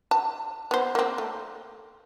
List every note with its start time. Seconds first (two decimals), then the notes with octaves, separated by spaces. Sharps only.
0.11 A5
0.71 B3 C5
0.95 A#3 C4
1.18 A3